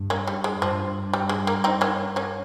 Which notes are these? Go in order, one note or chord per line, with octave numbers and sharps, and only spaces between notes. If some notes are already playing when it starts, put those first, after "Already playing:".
Already playing: G2
A#3 C#4
G3
G#3
G2 F3
G3
G#3
A#3
C4 D#4
A#3 C#4
A#3 C#4